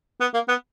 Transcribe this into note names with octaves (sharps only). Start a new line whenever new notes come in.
B3
A#3
B3